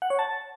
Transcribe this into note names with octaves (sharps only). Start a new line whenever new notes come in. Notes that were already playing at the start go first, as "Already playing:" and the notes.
F#5
C#5
A5